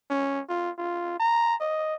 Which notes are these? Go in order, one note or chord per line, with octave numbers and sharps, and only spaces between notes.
C#4
F4
F4
A#5
D#5